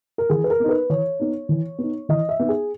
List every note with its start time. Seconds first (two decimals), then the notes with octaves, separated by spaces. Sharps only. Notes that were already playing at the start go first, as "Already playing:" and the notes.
0.18 A#4
0.29 E3 G#4
0.44 B4
0.50 A#4
0.60 B3 D#4
0.69 B4
0.90 E3 C#5
1.20 B3 D#4
1.49 E3
1.78 B3 D#4
2.09 E3 D#5
2.29 E5
2.39 B3 D#4
2.49 G#4